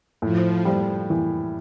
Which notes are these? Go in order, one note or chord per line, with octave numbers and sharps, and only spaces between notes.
A2 F3
G3
E3